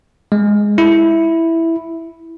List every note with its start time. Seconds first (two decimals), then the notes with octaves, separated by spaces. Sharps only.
0.32 G#3
0.78 E4